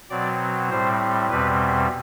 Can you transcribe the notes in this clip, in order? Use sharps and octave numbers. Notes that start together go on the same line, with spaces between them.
B2 F#3 C4 D5
A2 G3 C4 C5
E2 B2 G3 C4 B4